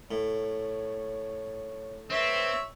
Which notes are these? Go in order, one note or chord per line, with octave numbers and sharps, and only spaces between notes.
A2 C#5
C4 B4 C#5 E5